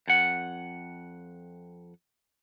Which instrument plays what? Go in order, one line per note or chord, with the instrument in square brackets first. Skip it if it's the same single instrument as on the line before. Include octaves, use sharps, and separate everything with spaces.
[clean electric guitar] F2 F#5